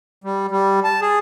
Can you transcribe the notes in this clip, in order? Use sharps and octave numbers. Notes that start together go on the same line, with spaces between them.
G3
G3
A5
G#4